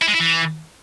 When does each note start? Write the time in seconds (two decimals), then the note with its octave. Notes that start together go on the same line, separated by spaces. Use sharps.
0.02 E4
0.08 G#3
0.14 E4
0.20 E3